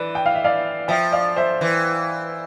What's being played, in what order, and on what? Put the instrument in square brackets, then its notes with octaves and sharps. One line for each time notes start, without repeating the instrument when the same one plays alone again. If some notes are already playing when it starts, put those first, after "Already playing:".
Already playing: [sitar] E3 [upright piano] B4 D5
[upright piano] G5
F5
E5
D5 F5
[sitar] F3 [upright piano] E5 G5
[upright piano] D5 F5
C5 E5
[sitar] E3